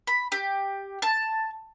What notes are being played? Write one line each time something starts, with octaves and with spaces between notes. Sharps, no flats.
B5
G4
A5